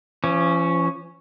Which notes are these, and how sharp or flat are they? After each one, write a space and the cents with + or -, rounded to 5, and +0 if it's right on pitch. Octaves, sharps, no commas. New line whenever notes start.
F3 -40 C#4 +0